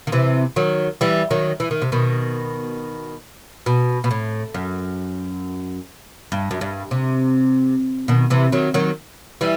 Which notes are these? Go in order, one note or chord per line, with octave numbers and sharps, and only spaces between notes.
D#3
C3 E3
D#3 F#3
E3 G3
D#3 F#3
E3
D#3
C3
B2 D#3
B2
B2
A2
F#2
G2
F#2
G2
C3
B2 D#3
C3 E3
D#3 F#3
D#3 F#3
E3 G3